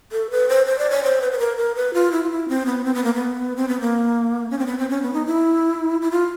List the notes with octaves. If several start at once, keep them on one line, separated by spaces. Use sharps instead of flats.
A4
B4
C5
C5
D5
C#5
C5
B4
B4
A#4
A#4
B4
F4
E4
F4
E4
C4
B3
C4
B3
A#3
B3
C4
B3
A#3
C#4
C4
B3
C4
C#4
B3
D#4
E4
E4
F4